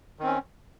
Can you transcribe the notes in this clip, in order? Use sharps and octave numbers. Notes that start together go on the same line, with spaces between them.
D#3 C4 C#4